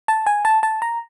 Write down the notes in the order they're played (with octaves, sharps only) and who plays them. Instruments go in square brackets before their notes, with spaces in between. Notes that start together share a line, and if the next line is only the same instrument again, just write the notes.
[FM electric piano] A5
G#5
A5
A5
A#5